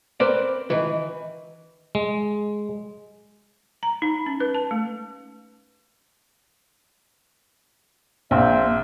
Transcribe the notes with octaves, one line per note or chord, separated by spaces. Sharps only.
C4 A#4 B4 D5
D#3 E3
G#3
A#5
D#4
C#4
B4
A5
A3
A#1 A#3 C4 E5